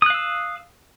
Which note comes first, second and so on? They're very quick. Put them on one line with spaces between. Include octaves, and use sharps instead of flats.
D#6 F#6 F5 E6